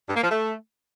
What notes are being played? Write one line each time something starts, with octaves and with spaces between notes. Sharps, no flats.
G2
A#3
F3
A3